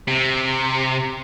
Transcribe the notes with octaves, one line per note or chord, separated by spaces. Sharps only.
C3